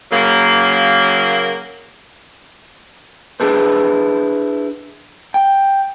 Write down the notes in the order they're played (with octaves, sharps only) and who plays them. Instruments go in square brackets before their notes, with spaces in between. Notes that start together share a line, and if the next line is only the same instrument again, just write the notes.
[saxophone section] C#3 F#3 A#3
[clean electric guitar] D4 E4 G#4 A4 B4 C5
G5